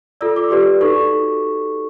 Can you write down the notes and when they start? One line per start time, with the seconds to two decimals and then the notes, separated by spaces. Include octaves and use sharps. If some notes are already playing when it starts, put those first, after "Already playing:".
0.21 F4 A4 D5 E6
0.36 D6
0.51 G4 B4 D5
0.81 D#4 F#4 A4 C#6